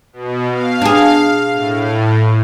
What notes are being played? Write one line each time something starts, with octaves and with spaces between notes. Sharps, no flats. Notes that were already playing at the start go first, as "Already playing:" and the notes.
B2
F5
D4 G#4
A2